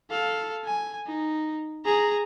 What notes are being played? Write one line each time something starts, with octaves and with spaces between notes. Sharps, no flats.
A4 F5
G#5
D#4
G#4 A#5